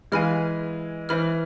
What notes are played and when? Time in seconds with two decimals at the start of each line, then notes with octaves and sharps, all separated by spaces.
0.12 E3 G#3 F5 G#5 B5 F6
1.09 E3 C5 E5 B5 F6